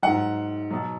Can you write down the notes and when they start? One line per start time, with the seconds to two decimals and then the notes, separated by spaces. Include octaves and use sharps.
0.03 G#2 F#3 F#5
0.71 B2 F#3